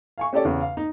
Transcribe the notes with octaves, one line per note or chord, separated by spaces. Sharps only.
F5 G#5 C#6
C#4 G4 A4 C#5 D5
E2 C#3
F5
D#4